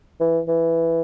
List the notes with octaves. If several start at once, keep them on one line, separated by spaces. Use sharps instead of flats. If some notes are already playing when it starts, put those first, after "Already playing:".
E3
E3